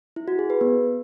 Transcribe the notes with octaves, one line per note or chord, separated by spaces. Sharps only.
E4
F#4
G#4
B4
B3